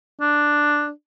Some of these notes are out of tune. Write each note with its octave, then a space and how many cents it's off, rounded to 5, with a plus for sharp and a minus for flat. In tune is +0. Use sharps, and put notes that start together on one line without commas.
D4 +5